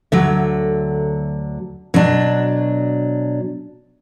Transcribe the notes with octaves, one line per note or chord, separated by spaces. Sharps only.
D2 D3 F#3 E5
B2 F#3 D4